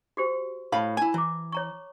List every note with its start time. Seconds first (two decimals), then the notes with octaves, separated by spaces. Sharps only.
0.17 F#4 G4 C5
0.72 A2 F5 A5 B5
0.97 E4 G#5
1.14 E3 A#5 D6
1.52 C#5 A#5 C#6